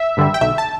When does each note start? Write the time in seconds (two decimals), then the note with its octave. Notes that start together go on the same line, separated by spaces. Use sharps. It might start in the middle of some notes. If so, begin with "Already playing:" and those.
Already playing: E5
0.17 G2 D3 G3
0.34 G5
0.41 B1 E5
0.58 A5